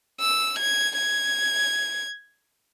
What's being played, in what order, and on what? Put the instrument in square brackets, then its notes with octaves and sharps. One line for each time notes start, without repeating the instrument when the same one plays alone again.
[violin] E6
G#6
G#6